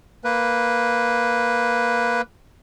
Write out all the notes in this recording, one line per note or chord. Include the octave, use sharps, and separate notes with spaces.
A#3 B4